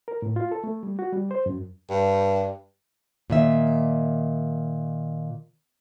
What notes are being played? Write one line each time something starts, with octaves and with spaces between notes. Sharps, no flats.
A#4
A2
F4
A4
A3
G3
F#4
G3
C5
F#2
G2
A#2 D#3 E5